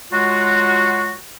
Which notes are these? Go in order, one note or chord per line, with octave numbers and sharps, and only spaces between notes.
F#3 G#3 F4 F#4